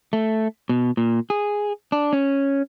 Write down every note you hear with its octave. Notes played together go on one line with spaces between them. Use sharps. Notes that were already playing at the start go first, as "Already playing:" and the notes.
A3
B2
A#2
G#4
D4
C#4